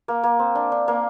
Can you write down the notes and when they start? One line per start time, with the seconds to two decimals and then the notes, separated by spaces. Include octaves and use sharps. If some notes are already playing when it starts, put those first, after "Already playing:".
0.08 A#3
0.23 A#3
0.39 C4
0.55 D4
0.72 D4
0.88 A#3